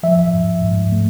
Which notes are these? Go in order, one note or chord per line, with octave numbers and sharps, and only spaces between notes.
F3 E5
G#2
G#2
A3